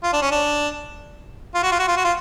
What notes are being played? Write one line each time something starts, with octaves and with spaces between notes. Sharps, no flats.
F4
D4
C#4
D4
F4
F#4
F4
F#4
F4
F#4
F4